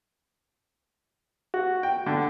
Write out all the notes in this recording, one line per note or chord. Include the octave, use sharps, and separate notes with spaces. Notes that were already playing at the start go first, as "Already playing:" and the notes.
F#4
G5
D3